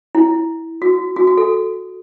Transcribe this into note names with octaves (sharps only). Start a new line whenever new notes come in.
E4
F#4
F#4
F#4
A4